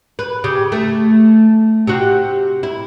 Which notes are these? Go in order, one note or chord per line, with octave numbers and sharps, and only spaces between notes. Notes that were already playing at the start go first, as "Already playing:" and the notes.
B4
C#3 G4
A3
C3 F#4
E4